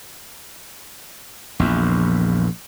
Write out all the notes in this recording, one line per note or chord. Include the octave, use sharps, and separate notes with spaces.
A#1 E2